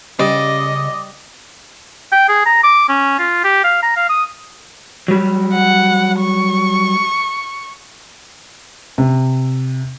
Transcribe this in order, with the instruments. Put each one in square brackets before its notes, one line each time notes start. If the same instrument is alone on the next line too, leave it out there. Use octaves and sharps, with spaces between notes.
[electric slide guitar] C#3 C#4 [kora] G3 [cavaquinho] D5 [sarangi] D#5
[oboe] G5
G#4
A#5
D6
C#4
F4
G4
F5
A#5
F5
D#6
[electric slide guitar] F#3 G3
[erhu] F#5
C#6
[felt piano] C3